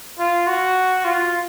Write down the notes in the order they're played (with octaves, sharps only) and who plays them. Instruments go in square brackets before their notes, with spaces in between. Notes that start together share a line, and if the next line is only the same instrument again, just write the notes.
[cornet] F4
F#4
F4